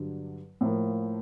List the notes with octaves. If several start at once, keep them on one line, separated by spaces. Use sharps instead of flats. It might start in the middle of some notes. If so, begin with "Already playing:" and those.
Already playing: G2 D3 F#3
A2 F3 A#3